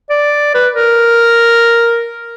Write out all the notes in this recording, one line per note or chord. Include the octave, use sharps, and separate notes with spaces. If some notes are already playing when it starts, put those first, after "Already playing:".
D5
B4
A#4